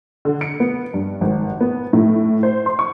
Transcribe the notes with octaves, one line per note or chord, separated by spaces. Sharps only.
D3
C#7
B3
G2
G#1
B3
A2
C5
C6
C#6